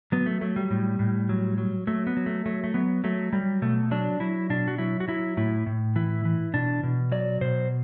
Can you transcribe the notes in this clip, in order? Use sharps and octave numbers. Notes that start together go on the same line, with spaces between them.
F#3 B3
A3
F#3 A3
G3
A2
A2
F#3
F#3
F#3 A3
B3
F#3
A3
F#3 A3
A3
F#3 B3
F#3 A3
F#3 G3
B2 A3
F#3 D4
F#3 E4
B2 D4
F#4
F#3 E4
F#4
F#3 E4
A2 E4
A2
E3 E4
E3
B2 D4
B2
F#3 D5
B2 C5